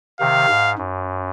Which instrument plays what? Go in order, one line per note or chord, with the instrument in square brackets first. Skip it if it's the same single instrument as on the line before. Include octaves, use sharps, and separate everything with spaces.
[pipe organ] C3 D#3 [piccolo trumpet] F5
[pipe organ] G#2
F#2